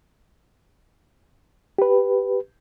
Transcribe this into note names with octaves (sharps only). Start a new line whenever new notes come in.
G4 B4